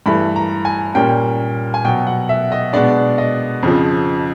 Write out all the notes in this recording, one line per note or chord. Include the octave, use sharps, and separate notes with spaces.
G2 E3 A3 B5
A#5
G#5
A#2 G3 A#3 C#4 G5
G#5
B2 F#3 B3 G5
F#5
E5
D#5
B2 G#3 B3 D4 D5
D#5
F2 C#3 F3